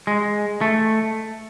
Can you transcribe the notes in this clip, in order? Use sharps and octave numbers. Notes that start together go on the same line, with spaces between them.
G#3
A3